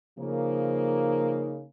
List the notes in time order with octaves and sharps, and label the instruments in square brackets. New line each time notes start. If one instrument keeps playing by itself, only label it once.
[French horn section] C#3 F3 A#3 D#4